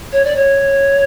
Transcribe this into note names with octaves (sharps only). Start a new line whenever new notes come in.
C#5
D5
C#5